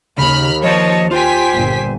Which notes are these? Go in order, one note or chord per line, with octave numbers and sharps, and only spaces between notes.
D#2 C#3 B5 F6
F3 C5 C#5 D#5 A5
F4 G4 C5 G#5 B6
G1 A#2